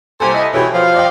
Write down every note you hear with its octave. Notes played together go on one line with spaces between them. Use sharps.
C2 A#3 G4 A4 C5 G#5
E4 D#5
B2 E3 A3 G4 C#5
F3 F5
D5 D#5 G5